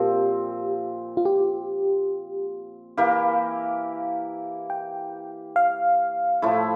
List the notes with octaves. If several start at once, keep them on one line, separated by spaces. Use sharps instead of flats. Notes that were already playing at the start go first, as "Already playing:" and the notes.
Already playing: A#2 F3 C4 G4
F4
G4
E3 A#3 E4 G4 F5
G5
F5
A2 F3 A3 E4